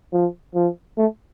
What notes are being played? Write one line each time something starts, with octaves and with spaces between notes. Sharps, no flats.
F3
F3
A3